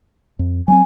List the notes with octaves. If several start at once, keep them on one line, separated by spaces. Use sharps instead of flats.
F2
F#3 A3 C4 G#5